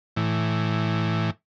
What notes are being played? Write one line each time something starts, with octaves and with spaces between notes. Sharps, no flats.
A2 E3